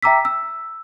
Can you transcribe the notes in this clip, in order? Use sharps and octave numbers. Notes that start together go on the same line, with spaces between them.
E5 G5 A#5 D6 E6 B6
E6